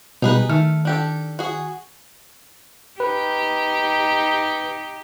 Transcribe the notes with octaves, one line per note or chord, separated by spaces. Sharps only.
B2 G3 D#4 G#4 B4
D#3 A3 F6
D4 G4 A4
F#4 G#4
D#4 G4 B4